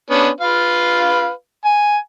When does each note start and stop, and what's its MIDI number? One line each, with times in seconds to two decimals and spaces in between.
0.10 0.29 59
0.10 0.29 61
0.10 0.29 62
0.40 1.29 65
0.40 1.29 71
0.40 1.29 77
1.65 1.97 80